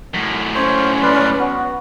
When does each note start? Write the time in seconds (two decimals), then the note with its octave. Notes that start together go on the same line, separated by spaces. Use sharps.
0.14 F#2 A2
0.55 C#4 C5 C#5
1.02 B4 D5 C6
1.39 B3 F#4